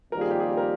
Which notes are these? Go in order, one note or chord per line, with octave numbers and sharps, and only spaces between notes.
F2 D#3 G3 A#3 F4 A#4
G#4
G4
G#4
A#4